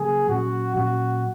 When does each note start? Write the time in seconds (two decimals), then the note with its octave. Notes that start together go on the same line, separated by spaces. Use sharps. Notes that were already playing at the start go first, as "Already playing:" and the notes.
Already playing: C#3 F#3 A#3 G#4
0.29 A#2 F#3 C#4 F#4
0.76 A#2 F#3 C#4 F#4